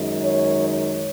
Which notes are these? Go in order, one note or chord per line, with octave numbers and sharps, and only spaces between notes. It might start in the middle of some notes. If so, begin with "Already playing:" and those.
Already playing: F#2 D#3 G#3
C#5
C#5